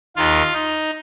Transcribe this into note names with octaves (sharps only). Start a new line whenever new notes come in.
D#2 D#3 F4
D#4